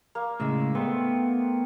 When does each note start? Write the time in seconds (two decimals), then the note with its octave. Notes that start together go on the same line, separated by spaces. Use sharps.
0.15 A#3
0.40 A2 C#3 G#3 E5
0.75 A3 B3 C4 D#4